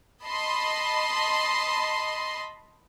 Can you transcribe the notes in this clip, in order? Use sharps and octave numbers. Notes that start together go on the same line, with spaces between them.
D#5 A5 B5 C6